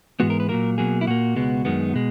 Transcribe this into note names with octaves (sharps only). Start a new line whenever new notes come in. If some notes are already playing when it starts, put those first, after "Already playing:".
G#2 E3 G#3 B3 F#4
A#4
B4
A#2 F#3 A#3 A#4
B2 F#3 A#3 G#4
E4
A#2 A#3 F#4
C#2 B2 G#3 B3
F#2 D#3 G#3 B3
B2 G#3